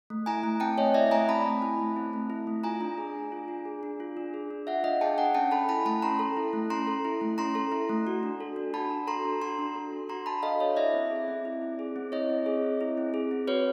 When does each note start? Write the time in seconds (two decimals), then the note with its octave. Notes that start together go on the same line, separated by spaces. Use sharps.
0.10 A3
0.26 E4 G#5 A#5
0.43 A3
0.60 C4 G5 A5
0.78 A3 C#5 D#5
0.94 E4 D5 E5
1.11 A3 G#5 A#5
1.29 C4 A5 B5
1.46 A3
1.62 E4
1.79 A3
1.96 C4
2.13 A3
2.30 E4
2.47 A3
2.64 F4 G#5 A#5
2.81 D4
2.98 G#4
3.15 D4
3.32 F4
3.48 D4
3.65 G#4
3.83 D4
4.00 F4
4.17 D4
4.34 G#4
4.51 D4
4.67 F4 E5 F#5
4.84 D4 D#5 F5
5.01 G#4 G5 A5
5.18 D4 F#5 G#5
5.34 C#4 G5 A5
5.51 A4 A5 B5
5.69 E4 A5 B5
5.85 A3 A5 B5
6.02 C#4 A#5 C6
6.19 A4
6.37 E4
6.53 A3
6.70 C#4 A#5 C6
6.87 A4
7.05 E4
7.21 A3
7.38 C#4 A#5 C6
7.55 A4
7.72 E4
7.89 A3
8.07 F#4
8.23 D4
8.41 A4
8.56 D4
8.74 F#4 A5 B5
8.90 D4
9.07 A4 A#5 C6
9.25 D4
9.42 F#4 A#5 C6
9.59 D4
9.75 A4
9.92 D4
10.09 F#4 A#5 C6
10.26 D4 A5 B5
10.43 A4 D#5 F5
10.60 D4 C#5 D#5
10.76 E4 D5 E5
10.94 C4
11.10 G#4
11.28 C4
11.45 E4
11.62 C4
11.79 G#4
11.96 C4
12.12 E4 C#5 D#5
12.29 C4
12.46 G#4
12.64 C4
12.81 E4
12.98 C4
13.14 G#4
13.31 C4
13.47 F#4 B4 C#5